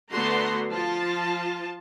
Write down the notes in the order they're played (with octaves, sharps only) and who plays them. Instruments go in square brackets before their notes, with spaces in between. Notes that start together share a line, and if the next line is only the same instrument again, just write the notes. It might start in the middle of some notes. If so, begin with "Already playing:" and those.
[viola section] D3 A3 B3 F#4 A#5 C6
F3 F4 A5